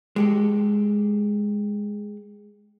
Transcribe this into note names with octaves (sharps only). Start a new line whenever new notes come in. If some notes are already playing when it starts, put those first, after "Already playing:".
G#3 G4 A4